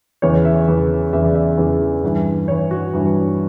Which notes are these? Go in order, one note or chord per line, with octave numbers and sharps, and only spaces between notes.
E2 C#3 E3 C#5
E5
E2 C#3 E3
E2 C#3 E3 E5
D5
E5
E2 C#3 E3
G2 E3
G2 E3 C#5
F#4
G2 E3